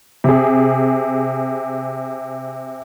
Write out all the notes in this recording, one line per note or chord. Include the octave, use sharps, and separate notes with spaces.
C3 G#4